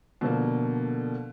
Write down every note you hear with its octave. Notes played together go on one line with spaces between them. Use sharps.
B2 D3 F3 A#3